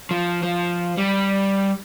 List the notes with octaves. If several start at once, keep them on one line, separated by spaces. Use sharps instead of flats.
F3
F3
G3